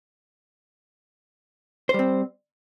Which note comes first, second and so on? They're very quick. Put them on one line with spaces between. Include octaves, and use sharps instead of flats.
C5 G3 C4